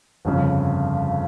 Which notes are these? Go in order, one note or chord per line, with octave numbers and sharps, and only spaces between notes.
G1 F2 C#3